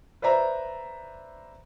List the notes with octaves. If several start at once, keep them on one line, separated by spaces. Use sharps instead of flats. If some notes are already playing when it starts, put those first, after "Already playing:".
B4 C5 D5 E5 A#5